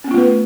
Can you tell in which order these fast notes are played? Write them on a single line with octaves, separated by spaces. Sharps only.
C#4 B3 F4 A3 B4